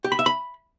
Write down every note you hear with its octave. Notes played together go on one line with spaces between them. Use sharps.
G4
B5
E5
B5